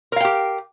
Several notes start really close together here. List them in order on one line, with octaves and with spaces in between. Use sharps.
A#4 F5 G5 G4